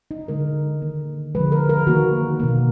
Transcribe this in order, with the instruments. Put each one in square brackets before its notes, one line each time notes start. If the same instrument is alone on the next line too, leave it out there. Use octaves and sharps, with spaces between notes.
[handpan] D#4
D3 G#3 A#4
D#3 A#3
D3 F3 G#3 B4
A#4
A#4
D#3 A#3 F#4
B2 A#3